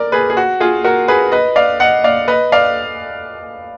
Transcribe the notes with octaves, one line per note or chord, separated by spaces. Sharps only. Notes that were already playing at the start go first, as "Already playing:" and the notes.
Already playing: A#4 D5
G#4 B4
G#4
F#4
F4 G#4
F#4 A#4
G#4 B4
B4 D#5
D5 F5
D#5 F#5
D5 F5
B4 D#5
D5 F5